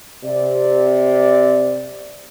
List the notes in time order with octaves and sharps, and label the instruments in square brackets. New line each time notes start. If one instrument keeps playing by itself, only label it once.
[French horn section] C3 D5